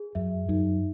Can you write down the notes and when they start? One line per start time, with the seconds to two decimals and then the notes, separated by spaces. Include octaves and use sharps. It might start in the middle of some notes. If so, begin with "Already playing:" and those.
Already playing: G#4
0.15 F#2 E5
0.48 F#2 D#4